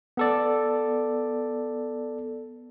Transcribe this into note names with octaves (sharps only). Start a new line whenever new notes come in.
B3 A4 D5